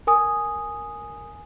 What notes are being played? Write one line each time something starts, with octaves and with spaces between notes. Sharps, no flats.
A#4 G#5 D#6